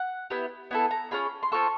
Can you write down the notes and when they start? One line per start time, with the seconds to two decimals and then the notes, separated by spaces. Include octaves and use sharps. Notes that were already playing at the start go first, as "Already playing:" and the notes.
Already playing: F#5
0.30 B3 E4 G4
0.71 B3 E4 A4 G#5
0.91 A#5
1.11 C#4 F4 G#4 B5
1.43 C6
1.52 C4 F4 A4 C#6